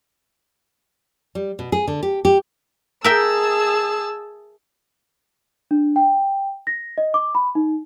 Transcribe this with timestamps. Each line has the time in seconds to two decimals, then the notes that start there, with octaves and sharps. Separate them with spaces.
1.35 G3
1.59 B2
1.72 G#4
1.87 D3
2.03 G4
2.25 G4
3.04 G#4 A#4 E5 G5 A5 E6
5.71 D4
5.96 G5
6.67 A#6
6.98 D#5
7.14 D6
7.35 B5
7.55 D#4